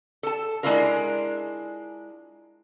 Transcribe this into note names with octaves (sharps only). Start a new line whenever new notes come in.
A4 A5
G#3 C4 D4 E4 F4 A#4